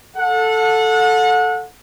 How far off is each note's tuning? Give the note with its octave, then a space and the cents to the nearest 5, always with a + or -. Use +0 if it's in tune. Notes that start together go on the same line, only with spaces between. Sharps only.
A4 +0 F#5 -30